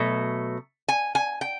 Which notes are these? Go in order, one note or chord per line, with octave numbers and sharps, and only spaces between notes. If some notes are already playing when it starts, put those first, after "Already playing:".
Already playing: B2 F#3 A3
G#5
G#5
G5